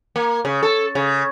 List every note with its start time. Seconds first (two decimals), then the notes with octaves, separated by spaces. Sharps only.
0.16 A#3
0.45 C#3
0.63 A4
0.95 C#3